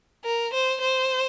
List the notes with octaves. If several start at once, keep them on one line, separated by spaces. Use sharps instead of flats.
A#4
C5
C5